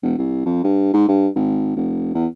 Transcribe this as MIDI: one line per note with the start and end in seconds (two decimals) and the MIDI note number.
0.03 0.13 28
0.18 0.43 36
0.45 0.63 41
0.64 0.93 43
0.93 1.05 44
1.09 1.28 43
1.36 1.72 32
1.76 2.13 29
2.14 2.27 40